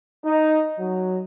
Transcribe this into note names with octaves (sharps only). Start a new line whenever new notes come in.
D#4
F#3